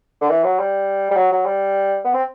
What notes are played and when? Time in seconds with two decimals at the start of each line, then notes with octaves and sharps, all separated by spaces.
0.21 D3
0.30 E3
0.44 F#3
0.59 G3
1.11 G3
1.16 F#3
1.32 F#3
1.45 G3
2.05 B3
2.13 C4